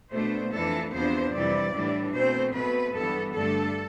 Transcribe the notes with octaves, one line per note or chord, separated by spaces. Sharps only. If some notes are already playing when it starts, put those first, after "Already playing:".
B2 A3 D4 C5
F2 E3 A3 D4 A4
E2 C3 F3 B3 D4 C5
F2 C3 E3 G3 D5
A2 E3 G3 D4
B2 A3 C4 C5
B2 A3 C4 B4
G2 E3 B3 A4
G2 D3 A3 D4 A4